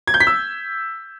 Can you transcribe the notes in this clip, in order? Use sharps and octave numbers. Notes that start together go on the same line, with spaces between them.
G#6
G6
B6
E6